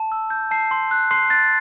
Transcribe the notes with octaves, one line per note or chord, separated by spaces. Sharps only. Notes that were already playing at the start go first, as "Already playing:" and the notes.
Already playing: A5
E6
G6
A5 C7
C6
F#6
C6 C7
F#6 A6